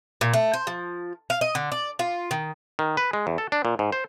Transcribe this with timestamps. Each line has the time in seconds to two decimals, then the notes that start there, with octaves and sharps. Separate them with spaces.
0.21 A#2
0.33 A3
0.53 C5
0.67 F3
1.30 F5
1.41 D#5
1.55 D3
1.72 D5
1.99 F4
2.31 D#3
2.79 D#3
2.97 B4
3.13 G#3
3.27 E2
3.38 A4
3.52 D4
3.65 A#2
3.79 G#2
3.92 C5